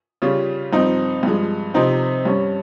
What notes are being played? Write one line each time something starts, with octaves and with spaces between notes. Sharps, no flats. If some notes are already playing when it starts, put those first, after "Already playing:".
C#3 G3 C#4 F4
G2 F3 C4 D#4
G2 F3 G#3
C3 F3 C4 D#4
G2 G3 C#4